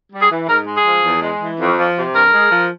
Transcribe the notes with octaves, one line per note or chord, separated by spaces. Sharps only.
G3
G#4
E3
G#2 A#4
G#3
G#4
F3
E2
G#3
E3
F2
F3
C3
G2 A#4
G#3
F3